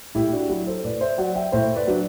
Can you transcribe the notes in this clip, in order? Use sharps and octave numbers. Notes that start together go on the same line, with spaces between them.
A2 E4 G4
D4 F#4
F#3 E4
A4 C5
A2 B4 D5
C5 E5
F#3 D5 F#5
E5 G5
A2 C5 E5
B4 D5
F#3 D4